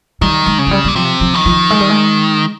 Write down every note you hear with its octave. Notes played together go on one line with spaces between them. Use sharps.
D#3 G3
G#3
C#3
F3
G3
A#2 G3
C3 F3
F3
D#3
F3
G#3
G3
G#3